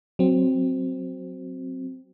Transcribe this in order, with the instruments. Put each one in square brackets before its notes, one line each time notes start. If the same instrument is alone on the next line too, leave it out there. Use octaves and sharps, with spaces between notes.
[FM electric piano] F#3 C4